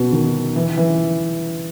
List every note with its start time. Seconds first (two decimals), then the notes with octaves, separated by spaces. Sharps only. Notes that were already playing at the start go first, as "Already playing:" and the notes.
Already playing: B2
0.12 D#3
0.56 E3
0.77 E3